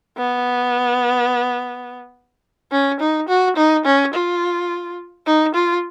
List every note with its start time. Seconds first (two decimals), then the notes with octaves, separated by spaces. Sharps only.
0.18 B3
2.72 C#4
3.00 D#4
3.28 F#4
3.57 D#4
3.85 C#4
4.13 F4
5.26 D#4
5.55 F4